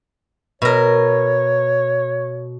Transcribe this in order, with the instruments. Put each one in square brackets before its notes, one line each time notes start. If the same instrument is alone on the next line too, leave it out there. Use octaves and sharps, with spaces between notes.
[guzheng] B2 A#4 [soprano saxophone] C#5